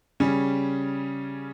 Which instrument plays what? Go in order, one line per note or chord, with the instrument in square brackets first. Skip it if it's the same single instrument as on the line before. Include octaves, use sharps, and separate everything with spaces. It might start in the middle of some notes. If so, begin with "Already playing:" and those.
[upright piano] C#3 G3 C#4